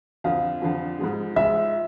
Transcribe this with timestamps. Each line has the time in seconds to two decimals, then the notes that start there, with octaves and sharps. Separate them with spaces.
0.24 F2 D3 F3 F5
0.62 F2 D3 F3
0.99 G#2 F3 G#3
1.36 G#2 F3 G#3 E5